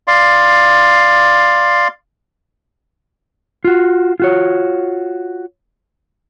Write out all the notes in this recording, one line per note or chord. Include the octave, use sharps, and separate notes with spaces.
D5 F5 C6
F4 F#4
F4 F#4 C#5